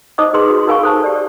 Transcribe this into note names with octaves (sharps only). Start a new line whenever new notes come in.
D#4 C5 D#5 D6 D#6
D#4 G#4 B4 C6
F#4 G#4
D#4 A#4 F5 G#5 B5 C#6
A4 C5 A5
G4 D5